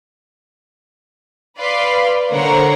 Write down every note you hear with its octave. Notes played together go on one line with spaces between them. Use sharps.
B4 D5 F5 B5 C6
D3 A#4 C5 C#5 F#5 A#5